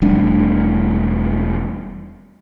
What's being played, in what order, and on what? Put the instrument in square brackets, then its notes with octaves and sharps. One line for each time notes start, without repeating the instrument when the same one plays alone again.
[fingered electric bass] E1 G3 A3 D4